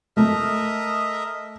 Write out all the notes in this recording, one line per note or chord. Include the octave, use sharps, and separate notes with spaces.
A3 A#4 D#5 E5